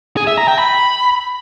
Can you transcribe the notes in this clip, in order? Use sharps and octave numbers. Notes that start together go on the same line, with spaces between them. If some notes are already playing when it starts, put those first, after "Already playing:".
G#4
E5
A#5
G5
B5